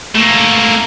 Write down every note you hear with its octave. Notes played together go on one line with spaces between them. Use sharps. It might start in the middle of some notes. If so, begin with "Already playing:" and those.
A3 A#3